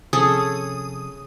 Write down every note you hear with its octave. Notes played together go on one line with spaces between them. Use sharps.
C3 F3 C#4 G#4 A4 D#6